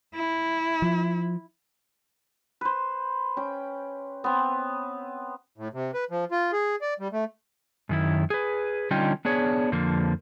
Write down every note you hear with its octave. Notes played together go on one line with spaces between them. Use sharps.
E4
F3
B4 C5
C#4 G5
B3 C4
A2
C3
B4
F3
F4
G#4
D5
G3
A3
F#2 D#3 E4
G#4 B4
D3 G3 C#4 D#4 F4 G5
B3 D4 G#4 C#5
F2 D3 F3 A#3